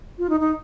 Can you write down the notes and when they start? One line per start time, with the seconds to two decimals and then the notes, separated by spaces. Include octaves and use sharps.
0.18 F4
0.29 D#4
0.40 D#4